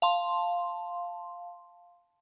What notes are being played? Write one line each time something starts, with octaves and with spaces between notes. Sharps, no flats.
F5 A5 C6